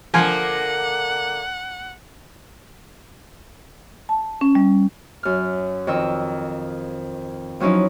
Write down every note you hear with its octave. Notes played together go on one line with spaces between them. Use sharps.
D3 F3 A#3 F#5 G#5
A5
C#4
G3
F#2 F6
F2 D#3 E6
F3 F#3 C#4 D#4 E4